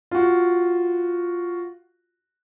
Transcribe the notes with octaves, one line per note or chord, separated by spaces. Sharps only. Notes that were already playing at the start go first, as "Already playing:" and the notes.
F4 F#4